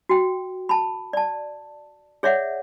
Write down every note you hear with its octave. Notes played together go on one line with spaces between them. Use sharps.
F#4 G5
A5 B5
D5 A5
G#4 C#5 D5 E5 F#5